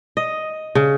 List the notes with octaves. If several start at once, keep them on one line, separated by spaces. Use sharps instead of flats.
D#5
C#3